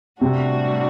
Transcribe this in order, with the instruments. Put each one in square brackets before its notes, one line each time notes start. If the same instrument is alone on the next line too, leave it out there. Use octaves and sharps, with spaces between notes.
[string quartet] A2 G3 D4 F#4 [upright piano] C3